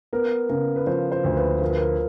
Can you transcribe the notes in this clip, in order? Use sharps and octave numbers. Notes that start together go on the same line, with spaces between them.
B3 A#4
C#3 A#4
B4
F3 C5
C5
D2
B4
F3 A#4
B4
A#4